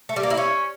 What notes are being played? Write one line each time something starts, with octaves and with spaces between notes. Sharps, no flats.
A3
G3
A#3
E4
C#4